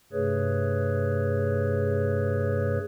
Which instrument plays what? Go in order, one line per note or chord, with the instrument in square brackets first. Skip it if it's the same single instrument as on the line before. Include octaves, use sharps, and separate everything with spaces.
[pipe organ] G2 C3 A3 G#4 B4 C#5